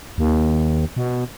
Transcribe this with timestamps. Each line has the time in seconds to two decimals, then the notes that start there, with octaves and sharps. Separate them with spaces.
0.18 D#2
0.96 B2